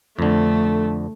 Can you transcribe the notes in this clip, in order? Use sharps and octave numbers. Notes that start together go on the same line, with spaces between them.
F2 D3 A3